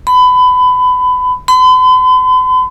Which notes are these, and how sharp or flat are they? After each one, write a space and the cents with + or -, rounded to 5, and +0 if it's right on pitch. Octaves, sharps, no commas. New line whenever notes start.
B5 +25
B5 +45